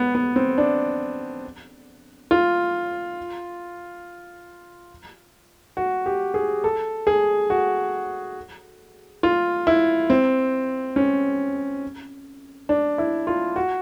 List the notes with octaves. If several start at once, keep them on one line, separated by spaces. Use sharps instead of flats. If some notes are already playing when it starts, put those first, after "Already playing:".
Already playing: B3
B3
C4
D4
F4
F#4
G4
G#4
A4
G#4
F#4
F4
E4
C4
C#4
D4
E4
F4
F#4